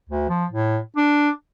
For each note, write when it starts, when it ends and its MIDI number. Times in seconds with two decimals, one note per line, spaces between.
0.10 0.26 38
0.29 0.46 53
0.51 0.78 45
0.97 1.30 62